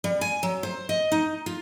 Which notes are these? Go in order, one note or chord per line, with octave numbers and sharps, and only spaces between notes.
G3
G#5
F#3
C5
D#5
D#4
F4